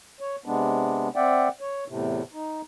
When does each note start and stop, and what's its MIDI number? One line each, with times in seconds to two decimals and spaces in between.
0.20 0.36 73
0.46 1.08 48
0.46 1.08 56
0.46 1.08 59
0.46 1.08 62
1.16 1.48 60
1.16 1.48 74
1.16 1.48 76
1.16 1.48 78
1.16 1.48 79
1.61 1.84 73
1.88 2.22 40
1.88 2.22 45
1.88 2.22 48
2.33 2.62 63